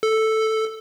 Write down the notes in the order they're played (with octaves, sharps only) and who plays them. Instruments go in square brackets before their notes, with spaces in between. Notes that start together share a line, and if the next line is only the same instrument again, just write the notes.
[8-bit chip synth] A4